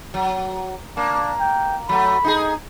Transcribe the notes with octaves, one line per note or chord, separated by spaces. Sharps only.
F#3
A#3 D4
G5
F#3 A3 B5
D#4 F4 G#4